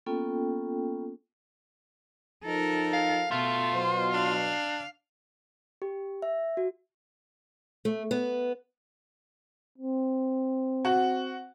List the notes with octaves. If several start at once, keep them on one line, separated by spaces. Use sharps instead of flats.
A#3 B3 C#4 F4 A4 G5
F3 D#4 A4 A#4
F5
B2 A3 F4
B2 F#3 C5
D4 F5
G4
E5
F#4
A3
B3
C4
F#4